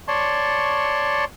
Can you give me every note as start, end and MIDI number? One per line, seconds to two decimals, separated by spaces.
0.08 1.25 73
0.08 1.25 74
0.08 1.25 81
0.08 1.25 84
0.08 1.25 85